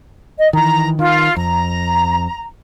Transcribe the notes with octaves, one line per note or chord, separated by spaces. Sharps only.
D#5
D#3 E3 A#5
D#3 F4
F2 A#5